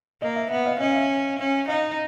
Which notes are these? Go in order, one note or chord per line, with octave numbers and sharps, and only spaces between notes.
A#3 D#5
E5
B3 E5
D#5 F5
C#4 D#5
F5
E5
C#4
D#4 D#5 F5